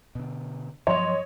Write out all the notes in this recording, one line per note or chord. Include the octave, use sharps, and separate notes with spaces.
B2 D3
G2 F3 F#3 C#5 D#5 C6 F7